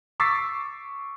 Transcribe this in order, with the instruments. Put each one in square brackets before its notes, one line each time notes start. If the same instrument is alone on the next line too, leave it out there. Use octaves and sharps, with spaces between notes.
[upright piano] C#6 D6 E6 A6 B6 C7